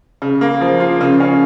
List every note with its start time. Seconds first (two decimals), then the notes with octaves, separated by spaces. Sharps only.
0.22 C#3
0.41 A#3
0.61 F3
0.80 F4
1.01 C#3
1.20 C#4